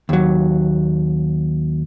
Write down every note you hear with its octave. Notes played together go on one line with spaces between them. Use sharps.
D#2 F#3